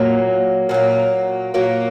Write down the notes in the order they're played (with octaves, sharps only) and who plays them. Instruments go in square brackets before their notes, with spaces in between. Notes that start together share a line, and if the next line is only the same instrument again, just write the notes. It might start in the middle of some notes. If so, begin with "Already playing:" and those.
Already playing: [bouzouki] A#2 F#3 A#3
A#2 F#3 A#3
A#2 F#3 A#3